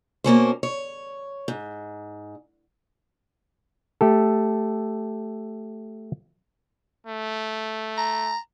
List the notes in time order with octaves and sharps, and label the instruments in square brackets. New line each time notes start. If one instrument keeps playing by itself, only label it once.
[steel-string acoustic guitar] B2 A#3 C#4 C5
C#5
G#2
[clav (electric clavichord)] A3 G4 A4
[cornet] A3
[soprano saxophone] A#5